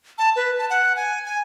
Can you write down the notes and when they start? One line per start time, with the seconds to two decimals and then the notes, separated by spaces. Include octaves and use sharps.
0.18 A5
0.36 B4
0.58 A5
0.70 F#5
0.96 G#5
1.26 G#5